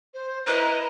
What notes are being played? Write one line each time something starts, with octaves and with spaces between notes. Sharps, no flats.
C5
E4 B4 D#5 A#5